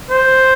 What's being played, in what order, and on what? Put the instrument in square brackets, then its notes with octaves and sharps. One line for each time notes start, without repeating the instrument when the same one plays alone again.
[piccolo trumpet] C5